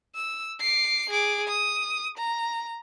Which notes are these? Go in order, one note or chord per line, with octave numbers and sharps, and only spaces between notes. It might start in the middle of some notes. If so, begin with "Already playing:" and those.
E6
D6 C7
G#4 D6
D#6
A#5